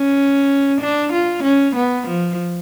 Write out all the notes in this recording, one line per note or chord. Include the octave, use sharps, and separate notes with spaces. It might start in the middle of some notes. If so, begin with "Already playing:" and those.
Already playing: C#4
D4
F4
C#4
B3
F3